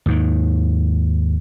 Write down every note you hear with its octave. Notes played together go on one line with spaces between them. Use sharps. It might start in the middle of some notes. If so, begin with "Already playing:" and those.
D#2 G#2 D#3